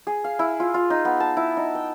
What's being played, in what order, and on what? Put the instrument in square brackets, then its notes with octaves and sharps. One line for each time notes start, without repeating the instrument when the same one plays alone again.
[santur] G#4
F5
E4
F4
F4
D#4
B3
A5
E4
D#4
G5